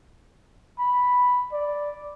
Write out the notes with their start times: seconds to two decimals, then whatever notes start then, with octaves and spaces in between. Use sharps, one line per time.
0.79 B5
1.52 D5